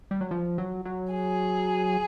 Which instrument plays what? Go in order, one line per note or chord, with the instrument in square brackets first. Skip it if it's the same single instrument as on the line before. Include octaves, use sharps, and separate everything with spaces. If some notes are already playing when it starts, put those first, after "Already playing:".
[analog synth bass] G3
F#3
F3
F#3
F#3
[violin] G#4